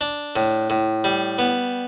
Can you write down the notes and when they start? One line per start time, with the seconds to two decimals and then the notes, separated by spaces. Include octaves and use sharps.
0.01 D4
0.36 A2
0.70 A2
1.04 G3
1.38 B3